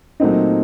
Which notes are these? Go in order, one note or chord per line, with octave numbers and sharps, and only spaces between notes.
A#2 F#3 A3 C4 D#4